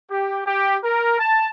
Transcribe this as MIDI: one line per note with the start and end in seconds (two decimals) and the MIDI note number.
0.10 0.41 67
0.46 0.78 67
0.84 1.17 70
1.20 1.50 81